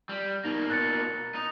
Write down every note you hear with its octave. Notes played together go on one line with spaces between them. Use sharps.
G3
B2 A#3 D#4
F#6 A6 C#7
D#4